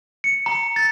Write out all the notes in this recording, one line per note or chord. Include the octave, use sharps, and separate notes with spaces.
C#7
A#5
A6